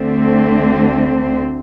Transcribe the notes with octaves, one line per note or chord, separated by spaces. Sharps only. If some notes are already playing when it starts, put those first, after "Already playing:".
Already playing: D2 D3 A3 C4